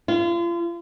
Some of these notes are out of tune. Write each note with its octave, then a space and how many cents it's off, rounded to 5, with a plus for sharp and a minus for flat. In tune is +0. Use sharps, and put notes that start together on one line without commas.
F4 -35